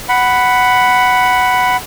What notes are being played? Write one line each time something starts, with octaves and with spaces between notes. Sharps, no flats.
F#5 B5